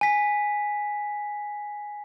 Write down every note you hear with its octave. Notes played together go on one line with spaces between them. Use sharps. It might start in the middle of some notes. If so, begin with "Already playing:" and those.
G#5 B6